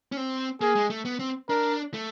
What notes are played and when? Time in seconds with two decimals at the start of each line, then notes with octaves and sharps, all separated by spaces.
0.12 C#4
0.17 C4
0.61 A#3 G#4
0.75 G#3
0.90 A3
1.05 B3
1.19 C4
1.49 D4 A#4
1.94 A3